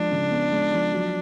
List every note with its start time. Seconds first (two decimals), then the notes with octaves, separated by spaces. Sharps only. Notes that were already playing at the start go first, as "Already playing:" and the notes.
Already playing: F3 G#3 D4
0.11 C#3
0.31 B3
0.52 G#3
0.73 F3
0.93 F#3